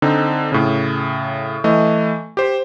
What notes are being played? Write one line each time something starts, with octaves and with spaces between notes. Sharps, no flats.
D3 C4 D#4
A2 C#3
E3 A3 D#5
G4 C5